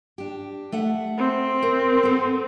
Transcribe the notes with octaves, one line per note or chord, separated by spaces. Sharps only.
D4 G4
A3 E5 F#5
C4
A#4
B3 A4